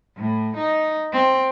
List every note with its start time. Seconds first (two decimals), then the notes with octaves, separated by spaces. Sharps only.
0.17 A2
0.57 D#4
1.13 C4